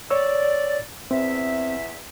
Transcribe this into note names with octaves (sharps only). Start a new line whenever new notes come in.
C#5 D5 E6
E2 C4 E5